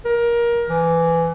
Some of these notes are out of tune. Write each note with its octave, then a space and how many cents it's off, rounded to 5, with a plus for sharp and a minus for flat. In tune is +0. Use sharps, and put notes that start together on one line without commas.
A#4 +20
E3 +20